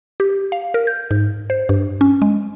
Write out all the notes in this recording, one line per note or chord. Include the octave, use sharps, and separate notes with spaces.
G4
F5
A#4
G6
G#2
C5
G2
C#4
G#3